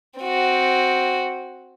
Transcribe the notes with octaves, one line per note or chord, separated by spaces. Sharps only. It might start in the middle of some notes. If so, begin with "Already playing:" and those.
C4 F#4